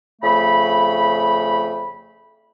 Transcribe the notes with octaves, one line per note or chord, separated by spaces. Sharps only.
F2 C#3 A3 B5